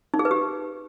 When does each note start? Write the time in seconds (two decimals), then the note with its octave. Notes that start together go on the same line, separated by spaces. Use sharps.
0.14 D#4
0.19 G#4
0.25 B4
0.31 G4